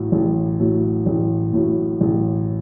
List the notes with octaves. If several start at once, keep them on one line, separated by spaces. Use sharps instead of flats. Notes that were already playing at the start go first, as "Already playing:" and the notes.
Already playing: A1 A2 F#3
A1
A2 F#3
A1
A2 F#3
A1